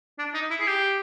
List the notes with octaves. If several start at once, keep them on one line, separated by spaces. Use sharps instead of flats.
D4
D#4
E4
G#4
G4